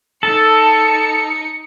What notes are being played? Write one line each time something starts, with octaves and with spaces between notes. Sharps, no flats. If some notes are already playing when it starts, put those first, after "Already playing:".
D#4 A4 C#7